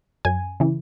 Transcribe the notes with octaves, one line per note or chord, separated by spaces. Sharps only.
F#2 G#5
C#3 E3